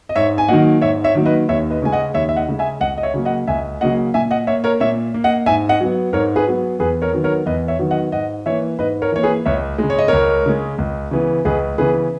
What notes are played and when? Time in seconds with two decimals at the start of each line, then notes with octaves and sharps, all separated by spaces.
0.09 D#5
0.16 G#2 C#5 E5
0.38 G#5
0.48 D#3 F#3 A#3 D#5 F#5
0.81 G#2 C#5 E5
1.04 C#5 E5
1.15 D#3 F#3 A#3
1.26 B4 D#5
1.49 D#2 C#5 E5
1.70 B4 D#5
1.82 C#3 G#3 G#5
1.92 D#5 F#5
2.14 D#2 C#5 E5
2.29 E5
2.36 D#5 F#5
2.48 C#3 G#3
2.59 E5 G#5
2.81 C#2 D#5 F#5
2.98 D#5
3.03 C#5 E5
3.14 C#3 F#3 A#3
3.25 D#5 F#5
3.48 C#2 E5 G#5
3.81 C#3 F#3 A#3 D#5 F#5
4.14 A#2 E5 G#5
4.31 D#5 F#5
4.47 A#3 C#5 E5
4.64 A#4 C#5
4.80 A#2 C#5 E5
5.14 A#3
5.24 D#5 F#5
5.46 G#2 E5 G#5
5.69 D#5 F#5
5.81 F#3 B3
6.13 G#2 A#4 C#5
6.36 G#4 B4
6.47 F#3 B3
6.79 E2 G#4 B4
7.02 A#4 C#5
7.12 D#3 F#3 B3
7.24 A#4 C#5
7.46 E2 B4 D#5
7.68 C#5 E5
7.79 D#3 F#3 B3
7.91 D#5 F#5
8.12 G#2 D#5 F#5
8.46 E3 A#3 C#5 E5
8.79 G#2 B4 D#5
9.02 A#4 C#5
9.12 E3 A#3 C#5
9.23 G#4 B4
9.46 C#2 C#5 E5
9.78 C#3 G#3
9.90 C#5
9.99 D#5
10.08 C#2 A#4 C#5
10.46 C#3 G#3
10.78 C#2
11.11 C#3 E3 B3
11.45 C#2 G#4 B4
11.78 C#3 E3 B3 G#4 B4